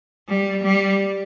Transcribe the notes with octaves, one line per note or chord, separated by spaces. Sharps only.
G3
G3